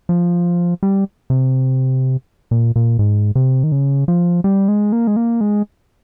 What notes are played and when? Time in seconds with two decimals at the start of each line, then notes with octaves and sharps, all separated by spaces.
0.09 F3
0.83 G3
1.30 C3
2.51 A#2
2.76 A#2
2.99 G#2
3.35 C3
3.63 D#3
3.72 C#3
4.08 F3
4.44 G3
4.68 G#3
4.92 A#3
5.07 G#3
5.16 A#3
5.41 G#3